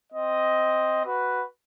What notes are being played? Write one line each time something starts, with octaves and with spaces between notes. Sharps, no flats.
C4 D#5
F#4 B4